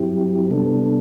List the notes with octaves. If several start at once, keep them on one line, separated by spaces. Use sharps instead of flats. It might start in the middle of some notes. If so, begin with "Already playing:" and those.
Already playing: G2 F#3 C4 E4 G4
C3 G3 B3 D4 A4